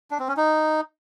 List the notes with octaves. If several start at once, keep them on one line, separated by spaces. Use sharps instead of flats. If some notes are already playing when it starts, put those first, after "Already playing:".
D4
C4
C#4
D#4